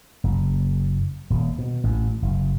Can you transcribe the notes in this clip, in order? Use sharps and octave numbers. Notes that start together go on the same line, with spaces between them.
F#1
D#1
B2
A1
F#1